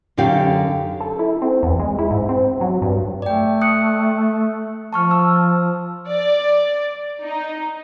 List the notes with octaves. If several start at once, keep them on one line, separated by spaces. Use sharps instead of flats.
F#2 D3 D#4 G4 F5
A4
E4
C4
E2
G#3
E4
G#2
C4
F#3
G2
A3 D5 G5
D#6 F#6 C#7
F3 A5 C#6 F6
E6
D5
D#4